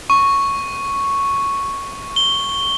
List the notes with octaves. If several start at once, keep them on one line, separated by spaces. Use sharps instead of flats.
C#6
G7